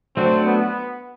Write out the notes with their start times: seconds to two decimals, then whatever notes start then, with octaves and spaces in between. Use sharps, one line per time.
0.16 F#3 A3 C4 D4 F#4
0.46 B3